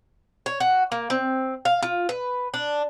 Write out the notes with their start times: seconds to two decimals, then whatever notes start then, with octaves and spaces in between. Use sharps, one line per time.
0.46 C#5
0.60 F#4
0.92 A#3
1.10 C4
1.65 F5
1.83 F4
2.09 B4
2.54 D4